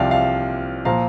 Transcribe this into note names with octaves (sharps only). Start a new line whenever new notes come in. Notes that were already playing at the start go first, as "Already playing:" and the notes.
Already playing: C2 C3 F3 D5 F5 G5
F5
A#2 F3 F5 A#5